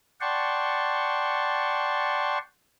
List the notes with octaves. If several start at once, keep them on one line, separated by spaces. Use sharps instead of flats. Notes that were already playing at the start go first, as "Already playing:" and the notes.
D5 F#5 G5 A5 C6 C#6